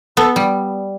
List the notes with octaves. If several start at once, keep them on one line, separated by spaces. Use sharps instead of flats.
B3 A4
G3